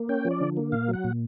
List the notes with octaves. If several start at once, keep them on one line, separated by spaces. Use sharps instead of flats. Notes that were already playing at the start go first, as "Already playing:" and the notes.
Already playing: A#3
C#4 G5
F3
D5
D3
A#3
A#2 F5
F#3 F#5
A#2